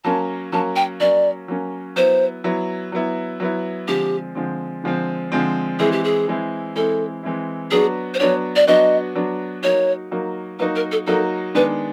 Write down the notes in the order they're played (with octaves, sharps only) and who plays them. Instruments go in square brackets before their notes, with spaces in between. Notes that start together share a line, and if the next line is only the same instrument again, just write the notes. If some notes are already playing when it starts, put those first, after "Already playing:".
[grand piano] F#3 A#3 C#4 [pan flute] A5
[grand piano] F#3 A#3 C#4 [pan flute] A5
[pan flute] G5
[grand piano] F#3 A#3 C#4 [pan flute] D5
[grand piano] F#3 A#3 C#4
[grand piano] F#3 B3 E4 [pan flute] C5
[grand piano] F#3 B3 E4
F#3 B3 E4
F#3 B3 E4
[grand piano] D3 F3 G#3 C4 [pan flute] G4
[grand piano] D3 F3 G#3 C4
D3 F3 G#3 C4
D3 F3 G#3 C4
[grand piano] E3 G#3 C4 E4 [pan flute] G#4
[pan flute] G4
G#4
[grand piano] E3 G#3 C4 E4
[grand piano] E3 G#3 C4 E4 [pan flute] A4
[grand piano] E3 G#3 C4 E4
[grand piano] F#3 B3 D4 F#4 [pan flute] G#4
[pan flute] C5
[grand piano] F#3 B3 D4 F#4 [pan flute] C#5
[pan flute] D5
[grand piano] F#3 B3 D4 F#4 [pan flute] D#5
[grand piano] F#3 B3 D4 F#4
[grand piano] F#3 A#3 D#4 F#4 [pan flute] C#5
[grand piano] F#3 A#3 D#4 F#4
[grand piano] F#3 A#3 D#4 F#4 [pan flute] B4
[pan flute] A#4
A4
[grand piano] F#3 A#3 D#4 F#4 [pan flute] A4
[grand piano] D#3 G#3 B3 D4 [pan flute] B4